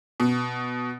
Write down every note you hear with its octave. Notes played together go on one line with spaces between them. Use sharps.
B2